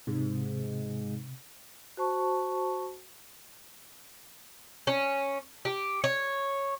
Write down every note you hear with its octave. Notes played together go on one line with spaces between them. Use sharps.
G#2 C3
F#4 C5 A5 C#6
C#4
G4
C#5